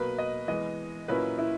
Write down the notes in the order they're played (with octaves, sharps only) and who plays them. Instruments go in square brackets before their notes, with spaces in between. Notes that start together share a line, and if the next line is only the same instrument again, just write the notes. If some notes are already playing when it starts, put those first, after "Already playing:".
Already playing: [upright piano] B2 F#3 A#3 [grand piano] B4
[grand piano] D#5
[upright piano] E3 G#3 B3 [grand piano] D#5
[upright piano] A#2 F#3 A#3 C#4 E4 [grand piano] B4
[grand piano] E4